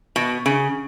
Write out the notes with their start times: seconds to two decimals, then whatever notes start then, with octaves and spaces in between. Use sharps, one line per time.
0.16 B2
0.46 C#3